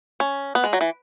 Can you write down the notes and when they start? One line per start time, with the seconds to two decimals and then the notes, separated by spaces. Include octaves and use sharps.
0.20 C#4
0.55 B3
0.64 G#3
0.73 F#3
0.81 E3